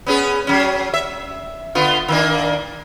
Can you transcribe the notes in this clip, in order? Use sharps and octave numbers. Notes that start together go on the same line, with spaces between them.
B3 C#4 G#4
F#3 C#4
E5
D3 B3 F4
D#3 A#3 D4